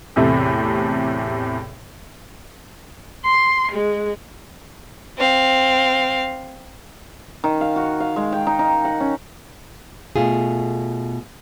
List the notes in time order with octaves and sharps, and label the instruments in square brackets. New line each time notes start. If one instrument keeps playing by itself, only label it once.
[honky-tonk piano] E2 A2 C3 A3 C4
[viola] C6
G#3
[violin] C4 F5
[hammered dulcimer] D#3
F5
F#4
F5
G#3
G5
D#4
D#4
F#5
C#4
[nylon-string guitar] B2 A3 F4 G#4